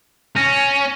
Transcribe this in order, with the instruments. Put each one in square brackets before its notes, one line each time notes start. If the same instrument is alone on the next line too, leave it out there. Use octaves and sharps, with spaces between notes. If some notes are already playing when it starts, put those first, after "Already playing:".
[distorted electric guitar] C#4 [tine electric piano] A#6